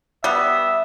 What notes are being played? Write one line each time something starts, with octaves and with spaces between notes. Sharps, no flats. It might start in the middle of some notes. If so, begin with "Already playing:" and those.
G3 B3 E5